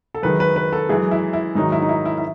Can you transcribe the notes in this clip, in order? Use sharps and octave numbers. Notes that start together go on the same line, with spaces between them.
A4
F#2 D#3 G#3 B4
B4
B4
A4
F#2 E3 G#3 G#4
E4
E4
G#2 D#3 F#3 D#4
E4
D#4
E4
E4
E4